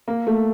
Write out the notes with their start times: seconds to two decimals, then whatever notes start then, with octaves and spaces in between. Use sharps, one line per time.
0.08 A#3
0.27 A3